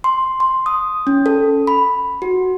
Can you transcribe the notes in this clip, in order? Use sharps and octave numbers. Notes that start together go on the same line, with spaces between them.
C6
C6
D#6
C#4
A4
B5
F#4